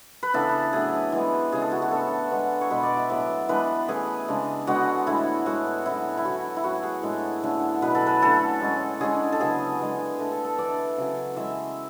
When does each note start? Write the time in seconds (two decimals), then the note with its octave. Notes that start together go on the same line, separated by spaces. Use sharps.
0.23 B4
0.34 C#3 E3 B3 D4 A4
0.73 A2 F#3 A3 D4 G#4
1.12 E3 G#3 B3
1.52 C#3 G#3 C#4 G#4
1.62 A4
1.72 F#4
1.82 F#4
1.91 A2 E3 B3 D4 A4
2.31 D3 G#3 B3 D4
2.61 C#5
2.70 B2 G#3 B3 B4
2.83 D5
2.97 E5
3.10 A2 F#3 B3 D4 D5
3.49 E3 G#3 B3 D4 B4
3.88 E3 A3 C#4 G#4
4.28 C#3 G#3 D4
4.67 D3 G#3 B3 F#4
5.06 A2 E3 A3 D4 E4
5.46 A2 G#3 B3 D4 F#4
5.86 D3 F#3 C#4 E4
6.17 E4
6.25 D3 F#3 B3 F#4
6.57 E4
6.64 A2 F#3 C#4 F#4
6.83 G#4
7.03 A2 G#3 D4
7.43 D3 A3 C#4
7.82 B2 F#3 C#4 B4
7.95 A4
8.07 B4
8.22 D3 A3 C#4 A4
8.61 A2 G#3 C#4
9.00 D3 G#3 C#4 G#4
9.32 A4
9.40 C#3 F#3 B3 G#4
9.79 D3 G#3 B3
10.19 D3 A3 D4
10.32 A4
10.45 A4
10.58 E3 A3 D4 D5
10.98 C#3 F#3 C#4
11.36 E3 G#3 C#4 E5